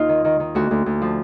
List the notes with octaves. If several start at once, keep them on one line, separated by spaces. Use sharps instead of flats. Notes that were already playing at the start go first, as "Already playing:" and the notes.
Already playing: D#2 D#4 F4
D#3
D#3
D#3
D2 F#4
D2
D2
F3